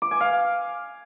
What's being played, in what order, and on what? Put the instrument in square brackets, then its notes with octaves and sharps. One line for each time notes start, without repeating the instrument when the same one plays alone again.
[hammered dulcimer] D6
G#5
F5